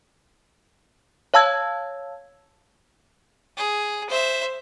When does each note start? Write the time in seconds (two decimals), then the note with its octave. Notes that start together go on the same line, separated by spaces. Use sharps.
1.34 C#5 F5 A5 E6 G#6
3.57 G#4
4.09 C5 E5